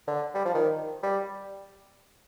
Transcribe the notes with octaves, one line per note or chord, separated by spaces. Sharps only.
D3
G3
F3
D#3
G3